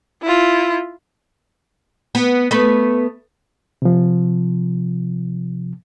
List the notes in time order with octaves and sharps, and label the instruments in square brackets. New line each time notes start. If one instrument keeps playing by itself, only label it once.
[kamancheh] E4 F4
[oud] B3
A3 B3 B4
[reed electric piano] C3 F3